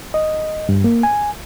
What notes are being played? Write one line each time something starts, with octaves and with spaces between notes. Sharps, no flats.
D#5
G2
A#3
G#5